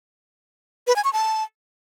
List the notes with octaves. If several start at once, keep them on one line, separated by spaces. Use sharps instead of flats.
B4
G#5
C#6
A5